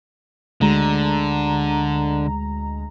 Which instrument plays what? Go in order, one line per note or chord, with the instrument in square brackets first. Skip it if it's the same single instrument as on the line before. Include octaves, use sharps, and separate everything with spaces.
[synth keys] D2 G#3 A#5 [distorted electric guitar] D3